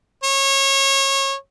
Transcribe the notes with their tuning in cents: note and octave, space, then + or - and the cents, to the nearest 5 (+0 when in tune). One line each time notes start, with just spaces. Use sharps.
C#5 -25